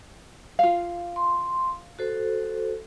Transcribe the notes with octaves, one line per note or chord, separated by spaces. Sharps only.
F4 F5
C6
F#4 A4 C5